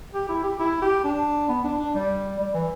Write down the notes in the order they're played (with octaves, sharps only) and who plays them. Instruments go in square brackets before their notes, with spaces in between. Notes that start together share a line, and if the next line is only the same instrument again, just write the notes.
[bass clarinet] G4
E4
G4
E4
G4
D4
B3
D4
D4
G3
G3
E3